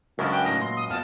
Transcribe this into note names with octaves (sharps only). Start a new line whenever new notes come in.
C#2 F#2 C#4 D4 A4 A#4 C#5 D#5
F#5 G5
A2 D#4 A#6
A#2 C6
D#6
F2 B3 F5 A5